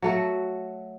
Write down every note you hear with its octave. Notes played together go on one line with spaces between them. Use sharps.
F#3 A3 F#4